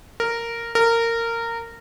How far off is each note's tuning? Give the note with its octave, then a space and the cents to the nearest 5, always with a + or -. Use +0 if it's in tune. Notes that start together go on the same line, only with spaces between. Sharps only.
A#4 -10
A#4 -20